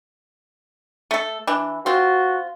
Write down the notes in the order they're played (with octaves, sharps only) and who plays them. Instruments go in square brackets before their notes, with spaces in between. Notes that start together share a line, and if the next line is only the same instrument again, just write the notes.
[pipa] A3 A4
E3 D4
[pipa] C4 F4 [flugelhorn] F#4